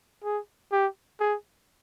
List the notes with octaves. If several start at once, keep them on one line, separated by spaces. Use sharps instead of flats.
G#4
G4
G#4